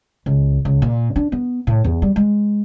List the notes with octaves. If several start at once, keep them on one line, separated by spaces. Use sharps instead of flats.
C#2
C#2
A#2
D4
B3
A2
E2
G3
G#3